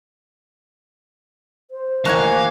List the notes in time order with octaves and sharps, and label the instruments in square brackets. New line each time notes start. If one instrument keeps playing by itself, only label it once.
[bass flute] C5
[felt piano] A1 C#6 F#6 [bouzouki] A#3 F#5 G#5 [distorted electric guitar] F5